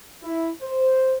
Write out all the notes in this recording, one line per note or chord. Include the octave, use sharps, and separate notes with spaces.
E4
C5